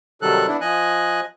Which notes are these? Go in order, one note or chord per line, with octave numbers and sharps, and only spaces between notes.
C3 D#3 F#3 G3 A4 F#6
B3 D4 E4
F3 D#5 G#5 F#6